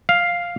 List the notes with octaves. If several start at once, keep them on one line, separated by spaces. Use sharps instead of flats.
F5